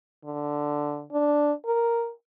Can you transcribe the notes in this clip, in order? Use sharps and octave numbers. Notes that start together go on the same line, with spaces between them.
D3
D4
A#4